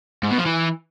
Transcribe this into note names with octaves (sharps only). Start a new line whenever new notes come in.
G#2
B2
F3
E3